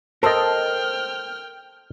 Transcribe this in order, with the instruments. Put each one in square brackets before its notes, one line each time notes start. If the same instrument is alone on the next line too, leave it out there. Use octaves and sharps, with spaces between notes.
[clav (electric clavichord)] A4 D#5 [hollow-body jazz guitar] A#4 C5 [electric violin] G5 F6